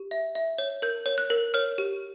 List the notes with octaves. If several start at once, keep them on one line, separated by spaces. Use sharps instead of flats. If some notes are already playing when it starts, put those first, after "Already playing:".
Already playing: G4
E5
E5
C#5
A#4 G6
C#5
F#6
A#4
C#5 F6
G4